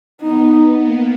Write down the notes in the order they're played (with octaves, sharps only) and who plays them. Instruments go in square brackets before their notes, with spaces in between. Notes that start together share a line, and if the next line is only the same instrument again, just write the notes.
[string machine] B3 [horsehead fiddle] D#4
[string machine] A#3